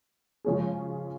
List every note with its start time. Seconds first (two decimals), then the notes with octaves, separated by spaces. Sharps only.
0.45 C#3 F3 G#3 C#4 G#4